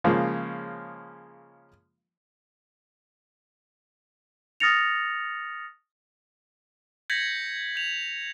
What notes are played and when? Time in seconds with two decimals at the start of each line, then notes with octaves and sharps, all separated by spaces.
0.04 C#3 F3 G#3 A#3
4.60 D#6 F6 A6 A#6 C#7 F7
7.10 G6 G#6 A#6 B6 C#7 F#7
7.76 G6 F7